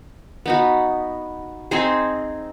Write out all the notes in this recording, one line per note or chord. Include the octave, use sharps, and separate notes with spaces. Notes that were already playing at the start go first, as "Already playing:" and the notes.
B3 D#4 F#4
C4 D#4 G#4 C5